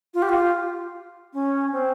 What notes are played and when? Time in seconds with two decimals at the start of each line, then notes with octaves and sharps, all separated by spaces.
0.14 F4
0.22 G4
0.29 F4
1.33 C#4
1.72 C4